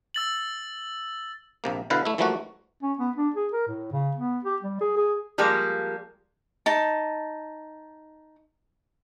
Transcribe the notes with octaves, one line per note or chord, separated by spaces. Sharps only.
E6 A6 F#7
A#1 C3 A#3
B2 D3 E4 B4 F5
A3 E4
E3 F3 G3 A3 A#3 F#4
C#4
B3
D4
G#4
A#4
A2
C#3
B3
G4
G3
G#4
G#4
F3 G3 G#3 A#3
D#4 A5